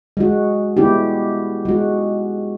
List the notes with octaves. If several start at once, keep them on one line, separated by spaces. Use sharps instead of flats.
G#3 F#4
G#3 B3 E4 G4
G#3 F#4